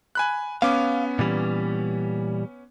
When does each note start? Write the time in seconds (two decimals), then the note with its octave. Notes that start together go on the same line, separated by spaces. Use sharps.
0.15 G#5 B5 F#6
0.62 B3 C#4 F5 D6
1.19 A#2 E3 G3